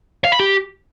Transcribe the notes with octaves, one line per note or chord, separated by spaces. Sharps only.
F5
B5
G4